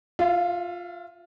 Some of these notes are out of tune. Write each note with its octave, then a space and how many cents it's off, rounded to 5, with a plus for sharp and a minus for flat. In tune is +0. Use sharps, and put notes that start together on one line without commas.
F4 +10 E5 +45